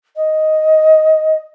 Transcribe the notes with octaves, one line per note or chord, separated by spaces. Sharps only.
D#5